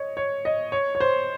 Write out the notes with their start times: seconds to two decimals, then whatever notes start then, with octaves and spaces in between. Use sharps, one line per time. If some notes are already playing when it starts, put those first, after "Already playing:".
Already playing: C#5 D#5
0.17 C#5
0.45 D#5
0.72 C#5
0.95 C#5
1.00 C5